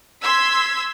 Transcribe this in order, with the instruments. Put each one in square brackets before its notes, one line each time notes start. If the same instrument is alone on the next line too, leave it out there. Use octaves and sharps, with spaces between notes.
[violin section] C6 E6 G#6 B6